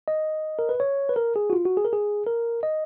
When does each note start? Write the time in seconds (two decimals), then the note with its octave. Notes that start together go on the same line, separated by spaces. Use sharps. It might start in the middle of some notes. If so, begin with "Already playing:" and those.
0.08 D#5
0.59 A#4
0.69 B4
0.80 C#5
1.09 B4
1.16 A#4
1.36 G#4
1.50 F#4
1.53 F4
1.65 F#4
1.77 G#4
1.85 A#4
1.93 G#4
2.27 A#4
2.63 D#5